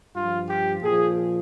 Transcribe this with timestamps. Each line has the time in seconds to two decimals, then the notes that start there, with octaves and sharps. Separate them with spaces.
0.15 G2 F3 F4
0.49 G4
0.82 A#2 F3 G#4